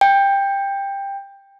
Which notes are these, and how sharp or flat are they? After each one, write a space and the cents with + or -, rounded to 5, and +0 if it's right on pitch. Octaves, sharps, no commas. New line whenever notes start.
G5 +15